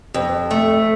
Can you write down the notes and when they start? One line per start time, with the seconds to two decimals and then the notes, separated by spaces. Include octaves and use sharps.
0.14 F2
0.51 A3